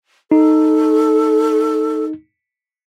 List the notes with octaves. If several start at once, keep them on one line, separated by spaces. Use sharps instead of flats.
D#4 A4